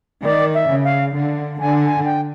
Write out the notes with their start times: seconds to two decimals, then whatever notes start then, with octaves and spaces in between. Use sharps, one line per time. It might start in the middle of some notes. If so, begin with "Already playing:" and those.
0.23 D#3 D5
0.54 E5
0.70 C#3
0.84 F5
1.15 D3
1.60 D3 G#5
1.85 G#5
2.05 G5